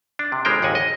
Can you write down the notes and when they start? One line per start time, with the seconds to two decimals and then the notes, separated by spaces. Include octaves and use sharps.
0.19 D4
0.32 C3
0.45 G1 G3 G#3 A#4 C5 G5
0.62 G#1 D#2 F#5 G#5
0.75 D#5